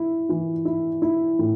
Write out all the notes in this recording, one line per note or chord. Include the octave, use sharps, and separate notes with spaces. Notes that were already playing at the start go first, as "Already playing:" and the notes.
Already playing: E4
E3
E4
E4
A2